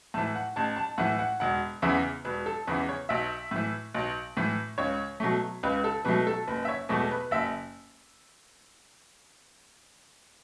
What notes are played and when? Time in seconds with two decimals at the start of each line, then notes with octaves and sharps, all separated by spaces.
0.14 A2 E3 A5
0.35 F#5
0.56 A1 A5
0.76 A5
0.98 A2 E3 F#5
1.19 F#5
1.40 E1 F#5
1.82 E2 C#3 E3 E5
2.25 E1 B4
2.46 A4
2.67 E2 C#3 E3 B4
2.89 C#5
3.09 B1 E5
3.51 A2 E3
3.94 B1
4.37 A2 E3
4.78 C#2 C#5
5.20 B2 F#3 A3
5.63 C#2 B4
5.84 A4
6.05 B2 F#3 A3 B4
6.27 A4
6.47 F#1 B4
6.65 E5
6.68 C#5
6.89 E2 B2 A3
7.11 B4
7.31 F#1 E5